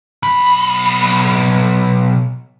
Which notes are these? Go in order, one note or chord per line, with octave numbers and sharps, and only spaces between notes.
B1 B5